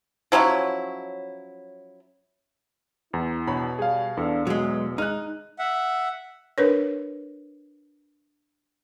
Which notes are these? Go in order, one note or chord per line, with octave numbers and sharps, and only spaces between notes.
F3 F#3 C#4 E4
E2 E4
B2 C#5 B5
G3 G#4 F5
E2 D4 A4 F5
B2 F#3 G#3
G#3 D#4 F6 F#6
E5 F#5
D4 A#4 B4 C#5